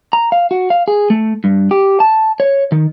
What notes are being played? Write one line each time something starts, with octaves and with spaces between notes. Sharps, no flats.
A#5
F5
F#4
F5
G#4
A3
G2
G4
A5
C#5
D#3